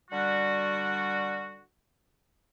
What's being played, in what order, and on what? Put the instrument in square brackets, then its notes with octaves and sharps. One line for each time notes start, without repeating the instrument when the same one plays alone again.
[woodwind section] D3 G3 F#4